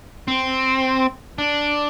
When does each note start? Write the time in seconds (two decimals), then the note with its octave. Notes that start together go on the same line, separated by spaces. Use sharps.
0.28 C4
1.38 D4